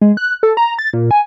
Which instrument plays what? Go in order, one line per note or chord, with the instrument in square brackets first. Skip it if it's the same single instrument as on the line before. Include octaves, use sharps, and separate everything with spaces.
[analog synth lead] G#3
F#6
A4
A#5
A6
A#2
G#5